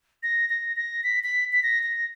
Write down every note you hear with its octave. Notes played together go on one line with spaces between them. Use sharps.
A#6
A#6
A#6
B6
B6
B6
A#6
A#6